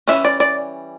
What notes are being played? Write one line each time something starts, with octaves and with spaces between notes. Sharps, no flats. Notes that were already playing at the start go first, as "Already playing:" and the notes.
E3 G3 C#4 E5
D5
D5